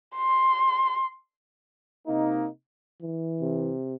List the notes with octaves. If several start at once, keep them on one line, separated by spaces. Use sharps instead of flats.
C6
C3 A#3 D#4
E3
C3